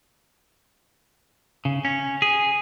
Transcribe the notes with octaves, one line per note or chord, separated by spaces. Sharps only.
C#3
C#4
G#4